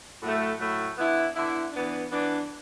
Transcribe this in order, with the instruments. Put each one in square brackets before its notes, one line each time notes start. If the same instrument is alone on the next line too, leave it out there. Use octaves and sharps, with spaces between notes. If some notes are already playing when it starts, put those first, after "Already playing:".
[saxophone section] A2 F#3 A3
A2 F#3 A3
D3 B3 E4
D3 B3 E4
E3 B3 D4
E3 B3 D4